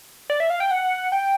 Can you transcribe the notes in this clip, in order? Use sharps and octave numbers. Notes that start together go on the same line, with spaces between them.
D5
E5
F5
G5
F#5
G5